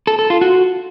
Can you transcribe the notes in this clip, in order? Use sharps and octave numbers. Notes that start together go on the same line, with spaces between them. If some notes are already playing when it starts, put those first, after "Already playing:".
A4
A4
F4
F#4